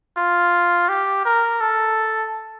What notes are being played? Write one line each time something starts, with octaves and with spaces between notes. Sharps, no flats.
F4
G4
A#4
A4